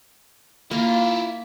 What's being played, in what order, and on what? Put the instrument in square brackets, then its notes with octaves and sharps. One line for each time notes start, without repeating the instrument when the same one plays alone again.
[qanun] A#3 [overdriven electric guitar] E4 F4